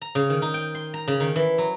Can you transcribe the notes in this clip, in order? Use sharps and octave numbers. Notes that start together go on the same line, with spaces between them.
A#5
C#3
D#3
D#4
G5
C6
A#5
C#3
D#3
E3
F#3